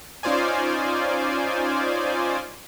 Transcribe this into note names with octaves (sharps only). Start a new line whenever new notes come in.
C#4 D#4 F4 C5 D5 G#5